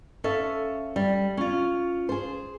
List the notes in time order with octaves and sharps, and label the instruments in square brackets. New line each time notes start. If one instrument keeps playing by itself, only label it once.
[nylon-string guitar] C#4 A4 E5 F5
G3
C#4 F4
G#4 C5